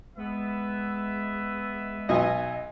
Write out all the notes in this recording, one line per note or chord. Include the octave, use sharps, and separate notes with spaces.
G#3 B3 E5
B1 D#5 G#5